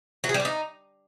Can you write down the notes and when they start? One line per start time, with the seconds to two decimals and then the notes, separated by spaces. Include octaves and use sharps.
0.24 F#3
0.29 G#4
0.34 G3
0.40 D4
0.45 D#4